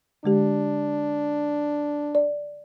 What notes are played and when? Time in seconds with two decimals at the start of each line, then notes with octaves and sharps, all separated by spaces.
0.24 D3 G#3 D4 G4
2.15 D5